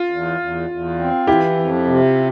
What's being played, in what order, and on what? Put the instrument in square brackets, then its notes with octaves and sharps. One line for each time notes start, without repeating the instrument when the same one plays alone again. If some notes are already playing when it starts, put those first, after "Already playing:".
Already playing: [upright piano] F4
[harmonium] E2
E2
E2
C4
[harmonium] E3 [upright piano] E4 G4
[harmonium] F2
C3